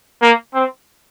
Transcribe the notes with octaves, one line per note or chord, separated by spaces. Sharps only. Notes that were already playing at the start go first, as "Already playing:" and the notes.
A#3
C4